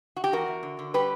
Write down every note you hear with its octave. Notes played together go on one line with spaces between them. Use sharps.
F#4
G4
E2 F#4 A#4
E2
D3
D3
G3 G4 B4